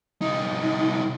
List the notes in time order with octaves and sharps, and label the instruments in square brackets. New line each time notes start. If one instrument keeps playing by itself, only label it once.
[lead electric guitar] C2 D#4